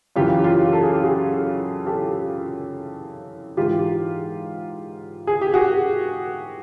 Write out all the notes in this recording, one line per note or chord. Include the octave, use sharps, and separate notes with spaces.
F#2 C#3 E3 F4 G4
F4 G4
A4
G#4
G4
F#4 G#4
G4 A4
G#2 E3 F4 G4
G#4
G4
F#4 G#4